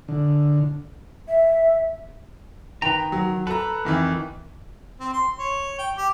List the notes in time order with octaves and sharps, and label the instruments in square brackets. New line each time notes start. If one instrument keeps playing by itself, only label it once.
[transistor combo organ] D3
[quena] E5
[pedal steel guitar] D#3 A#5 [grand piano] B4 G5
[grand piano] F#3
[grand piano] A4 A#5 [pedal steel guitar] B4
[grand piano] F2 D#3 E3
[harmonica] C4
C6
C#5
G5
G4